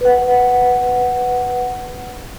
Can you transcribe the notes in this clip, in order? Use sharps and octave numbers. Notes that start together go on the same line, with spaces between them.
B4 F#5